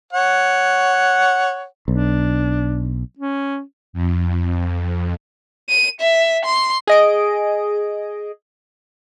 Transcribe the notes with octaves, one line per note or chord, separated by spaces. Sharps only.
C#5 F#5
B1 D4
C#4
F2
D#7
E5
C6
G#4 D#5 D7